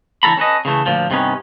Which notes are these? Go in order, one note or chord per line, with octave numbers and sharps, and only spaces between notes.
D3 E3 F#4 A4 A#5 B5
C#4 A4 B4 D#5
C#3 E3 A3
D2 A#2 F3
G2 C3 D#3 B3 C#4